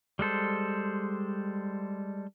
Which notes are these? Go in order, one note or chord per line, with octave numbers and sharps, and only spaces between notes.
G3 G#3 A4 C5